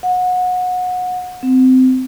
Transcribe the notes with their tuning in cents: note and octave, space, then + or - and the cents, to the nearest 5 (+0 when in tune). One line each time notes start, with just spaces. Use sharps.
F#5 -25
C4 -20